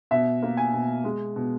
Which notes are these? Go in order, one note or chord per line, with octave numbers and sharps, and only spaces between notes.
B2 E5
A#3
G#5
B2
G#3
B2